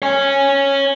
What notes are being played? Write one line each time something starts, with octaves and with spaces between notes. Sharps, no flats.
C#5 G#5